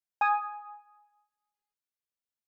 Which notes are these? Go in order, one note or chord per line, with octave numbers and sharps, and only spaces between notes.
G#5 D#6